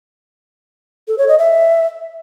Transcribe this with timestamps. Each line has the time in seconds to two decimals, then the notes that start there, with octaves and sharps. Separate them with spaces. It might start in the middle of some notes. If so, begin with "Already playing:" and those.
1.08 A4
1.18 C#5
1.28 D#5
1.39 E5